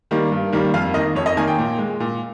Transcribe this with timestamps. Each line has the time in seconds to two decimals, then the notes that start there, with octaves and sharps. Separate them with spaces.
0.11 D#3 G3 A#3
0.32 G2
0.52 D#3 G3 A#3
0.74 F2 F5
0.94 D#3 A#3 D#5
1.15 F2 C#5
1.26 D#5
1.37 D#3 A#3 G#5
1.47 G5
1.58 A#2
1.78 G#3
2.00 A#2